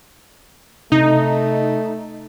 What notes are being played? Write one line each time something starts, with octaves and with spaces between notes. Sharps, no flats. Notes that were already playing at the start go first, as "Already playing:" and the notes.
C3 A3 D#4